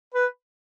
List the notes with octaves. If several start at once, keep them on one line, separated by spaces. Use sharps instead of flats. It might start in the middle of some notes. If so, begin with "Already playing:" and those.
B4